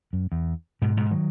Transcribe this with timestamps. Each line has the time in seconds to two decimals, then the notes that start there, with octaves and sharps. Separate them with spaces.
0.13 F#2
0.32 E2
0.82 G#2 B2
0.97 G#2 B2
1.11 D#3 F#3